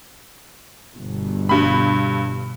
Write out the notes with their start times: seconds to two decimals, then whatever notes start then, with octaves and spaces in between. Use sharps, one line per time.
0.95 G1 B2
1.49 G2 B5